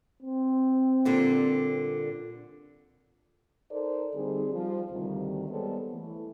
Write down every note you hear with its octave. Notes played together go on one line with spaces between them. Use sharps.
C4
A#2 D3 G3
D#4 A4 A#4 C5 D5
D3 G3 C4 D#4 G#4
F3 G3 F4
D2 C3 D#3 G3
G3 G#3 B3 A4 C5 C#5
E3 A3